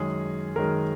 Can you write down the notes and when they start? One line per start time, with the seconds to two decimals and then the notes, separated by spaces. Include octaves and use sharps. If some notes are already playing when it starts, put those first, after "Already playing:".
Already playing: F#2 D#3 G#3 G#4
0.56 F#2 D#3 G#3 A#4